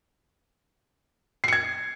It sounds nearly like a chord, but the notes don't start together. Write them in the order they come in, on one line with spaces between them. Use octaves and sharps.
C7 C#7 G#6